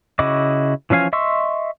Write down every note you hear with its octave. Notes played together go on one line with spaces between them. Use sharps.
C#3 E4 F#4 D#5 D6
E3 F3 C#4 F5 G#5
D#5 E5 C6 C#6 E6